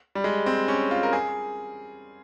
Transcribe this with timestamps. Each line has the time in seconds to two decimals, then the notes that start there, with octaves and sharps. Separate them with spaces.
0.15 G3
0.24 G#3
0.46 C4
0.68 C#4
0.91 F4
1.03 A#4
1.13 G#4